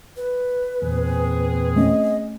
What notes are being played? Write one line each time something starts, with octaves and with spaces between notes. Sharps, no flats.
B4
E2 A#2 C4 G#4
A3 C#4 D#5